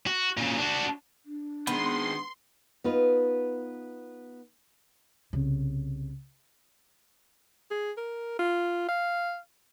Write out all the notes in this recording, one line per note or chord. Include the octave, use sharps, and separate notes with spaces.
F#4
A#2 C#3
D4 F#4
D4
D#3 G#3 B3 C6
B3 D#4 F4 B4
C2 C#3
G#4
A#4
F4
F5